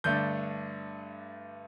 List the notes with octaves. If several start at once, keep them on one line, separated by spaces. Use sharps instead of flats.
G2 D3 A3 D4 G6